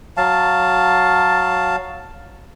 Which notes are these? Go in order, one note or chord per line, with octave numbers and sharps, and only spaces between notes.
F#3 F5 A5